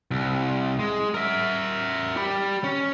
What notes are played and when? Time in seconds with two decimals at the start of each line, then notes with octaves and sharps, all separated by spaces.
0.11 C2
0.79 G#3
1.14 A#4 E5
2.17 G4 B5
2.64 C#4